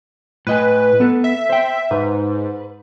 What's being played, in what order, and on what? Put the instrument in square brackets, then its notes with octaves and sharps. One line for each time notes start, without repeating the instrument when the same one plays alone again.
[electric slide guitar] A2 D#5 G#5 [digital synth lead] B4
[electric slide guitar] B3 A4
[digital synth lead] E5
[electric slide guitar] C5 G5
[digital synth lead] G#2 [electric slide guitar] B4